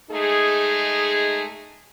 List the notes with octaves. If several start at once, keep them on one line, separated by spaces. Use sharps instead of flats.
G#3 A3 D#4 G#4